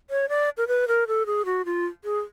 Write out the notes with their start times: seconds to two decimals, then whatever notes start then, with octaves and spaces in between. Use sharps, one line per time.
0.10 C#5
0.29 D5
0.57 A#4
0.68 B4
0.88 A#4
1.07 A4
1.26 G#4
1.45 F#4
1.65 F4
2.04 G#4